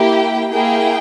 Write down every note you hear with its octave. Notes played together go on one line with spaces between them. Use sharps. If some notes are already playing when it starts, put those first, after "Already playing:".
Already playing: A#3 E4 G4 G5
A#3 E4 G#4 G5